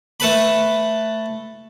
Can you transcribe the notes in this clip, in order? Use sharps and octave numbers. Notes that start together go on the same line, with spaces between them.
A3 A4 B4 B5